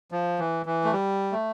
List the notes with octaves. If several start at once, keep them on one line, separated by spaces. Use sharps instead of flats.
F3
E3
E3
A3
G3
A3